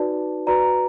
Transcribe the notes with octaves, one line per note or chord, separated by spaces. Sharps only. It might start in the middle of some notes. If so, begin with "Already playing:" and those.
Already playing: D#4 F#4 B4 D5 A5
F#4 B4 D5 A#5